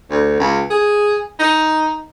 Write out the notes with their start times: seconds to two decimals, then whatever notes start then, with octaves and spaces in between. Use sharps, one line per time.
0.10 D2
0.40 C#2
0.70 G#4
1.40 D#4